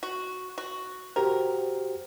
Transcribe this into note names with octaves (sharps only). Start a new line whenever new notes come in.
F#4
F#4
F#4 G4 A#4 C5